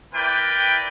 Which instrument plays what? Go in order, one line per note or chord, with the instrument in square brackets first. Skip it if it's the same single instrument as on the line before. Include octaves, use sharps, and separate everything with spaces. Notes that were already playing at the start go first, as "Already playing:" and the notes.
[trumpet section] E4 A#4 B4 D5 G5